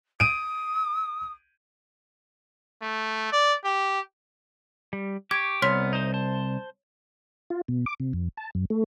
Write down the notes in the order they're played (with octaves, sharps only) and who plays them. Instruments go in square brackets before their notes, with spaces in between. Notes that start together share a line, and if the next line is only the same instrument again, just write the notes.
[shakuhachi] D#6 [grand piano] D7 D#7
[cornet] A3
D5
G4
[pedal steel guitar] G3
[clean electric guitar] G4 [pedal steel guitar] C#6 D6 [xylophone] G#6
[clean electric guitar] C2 [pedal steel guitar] B3 F6 [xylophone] C#5 C6 B6
[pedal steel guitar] D#4 C5
C5 A5
[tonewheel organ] F4
B2
D6
C3
F2
A5
F#2
A3